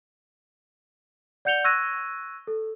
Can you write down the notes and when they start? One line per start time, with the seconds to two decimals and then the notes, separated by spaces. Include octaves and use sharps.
1.45 D5 F#5 G6 C#7 F7 G7
1.64 C#6 E6 F#6 G#6 A#6 D#7
2.47 A4